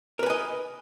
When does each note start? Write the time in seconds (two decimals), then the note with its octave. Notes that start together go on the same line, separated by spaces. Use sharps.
0.19 A#4
0.23 B4
0.26 G#5
0.30 D#5